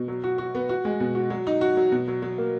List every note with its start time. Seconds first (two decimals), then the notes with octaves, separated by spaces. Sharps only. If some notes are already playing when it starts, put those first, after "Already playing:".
Already playing: B2
0.08 F#3
0.24 F#4
0.38 F#4
0.55 B3
0.69 F#4
0.85 G#3
1.00 B2
1.15 F#4
1.30 F#3
1.47 D#4
1.61 F#4
1.77 F#3
1.92 B2
2.08 F#3
2.22 F#3
2.38 A#3